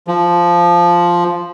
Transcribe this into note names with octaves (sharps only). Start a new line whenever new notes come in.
F3